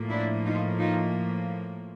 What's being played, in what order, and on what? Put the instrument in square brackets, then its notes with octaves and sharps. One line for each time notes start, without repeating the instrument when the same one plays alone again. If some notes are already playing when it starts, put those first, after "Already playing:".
Already playing: [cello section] A2 F3 A#3
D4 E4
D#4 F4
D#4 F4